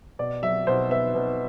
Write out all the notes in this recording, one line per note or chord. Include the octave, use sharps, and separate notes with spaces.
B2 D5
F#3 E5
B2 C5
B3 E5
B2